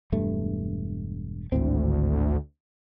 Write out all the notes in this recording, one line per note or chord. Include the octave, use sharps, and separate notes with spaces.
E1 G2 A3
G#1 D2 A2 C4